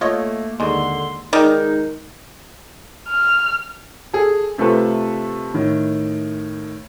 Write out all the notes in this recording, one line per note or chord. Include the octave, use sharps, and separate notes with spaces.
A3 A#3 F4 C#5 D#5
D#2 D3 G#3 C6
D#3 G#3 D#4 D5 G5
F6
G#4 A4
C3 A3 F4 A4 B4
A2 D#3